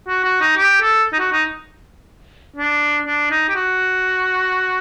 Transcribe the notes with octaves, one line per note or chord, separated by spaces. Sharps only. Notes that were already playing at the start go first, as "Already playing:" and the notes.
F#4
F#4
D#4
G4
A4
D#4
F#4
D#4
D4
D4
D#4
G4
F#4